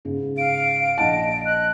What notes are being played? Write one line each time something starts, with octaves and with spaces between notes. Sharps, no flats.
G#2 C#3
F5 D7
A#1 D#5 F#5 A5 D7
F#6